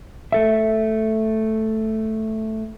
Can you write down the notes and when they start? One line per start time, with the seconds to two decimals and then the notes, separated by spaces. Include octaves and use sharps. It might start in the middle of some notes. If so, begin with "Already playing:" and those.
0.32 A3 A4 E5